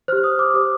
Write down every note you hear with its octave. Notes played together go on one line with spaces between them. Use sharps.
G4 C5 F6
D#6
D6
G4 C5 D#6